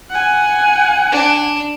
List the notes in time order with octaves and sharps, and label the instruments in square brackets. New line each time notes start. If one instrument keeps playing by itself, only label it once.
[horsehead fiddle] F#5 G#5
[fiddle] D4